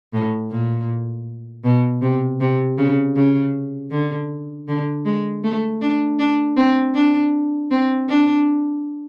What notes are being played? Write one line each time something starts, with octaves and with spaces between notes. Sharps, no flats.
A2
A#2
B2
C3
C3
C#3
C#3
D3
D3
G#3
A3
D4
D4
C4
D4
C4
D4